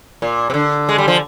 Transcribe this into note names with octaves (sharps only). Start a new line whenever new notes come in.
A#2
C3
D3
G#3
G3
F3